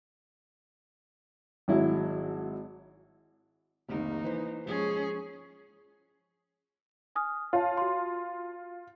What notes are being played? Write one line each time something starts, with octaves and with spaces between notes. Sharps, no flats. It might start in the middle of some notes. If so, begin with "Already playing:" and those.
G#1 F#3 E4
F1 C2 D#3 A#3 D#4
E3 B4 C5
F3 G#3 C#4 G#4
G#5 D#6 F6
F4 C#5 A5
F#4 C6